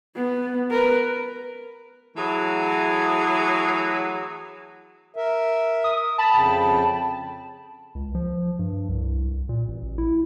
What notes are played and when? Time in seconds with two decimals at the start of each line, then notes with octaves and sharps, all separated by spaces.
0.16 B3
0.71 A#4 B4
2.16 E3 F#3 A3 G#4
5.16 A#4 E5
5.84 D#6
6.18 A5 B5
6.33 F2 C#3 G5
7.95 C#2
8.15 F3
8.59 G2
8.89 C2
9.49 A#2
9.68 A1
9.98 E4